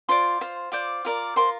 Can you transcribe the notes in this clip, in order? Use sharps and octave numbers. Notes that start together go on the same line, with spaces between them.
F4 C5 D5 C6
F4 C5
F4 C5 D5 D6
F4 A#4 D5
F4 A#4 C5 C6